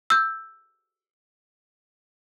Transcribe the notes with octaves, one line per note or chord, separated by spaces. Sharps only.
E6 G6